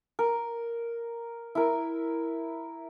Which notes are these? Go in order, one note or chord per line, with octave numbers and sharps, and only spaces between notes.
A#4
E4 A#4